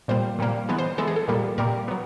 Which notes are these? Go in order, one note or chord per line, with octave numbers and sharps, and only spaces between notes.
A#2 G3 A#3 C5
A#2 G3 A#3
E3 G#3 B3
C5
E3 G#3 B3 A4
G#4
A4
A#2 G3 A#3
A#2 G3 A#3 A#4
F#3 B3